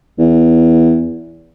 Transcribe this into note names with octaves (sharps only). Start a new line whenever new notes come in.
E2